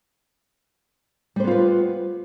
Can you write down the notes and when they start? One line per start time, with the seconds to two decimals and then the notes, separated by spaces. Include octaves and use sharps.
1.36 G3
1.40 C5
1.44 B3
1.47 F4
1.51 B4